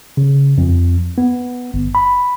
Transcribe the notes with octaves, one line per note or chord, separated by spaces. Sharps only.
C#3
F2
B3
G1
B5